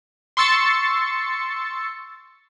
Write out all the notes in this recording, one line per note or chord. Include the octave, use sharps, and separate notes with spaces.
C6 C#6 E6 A6 C#7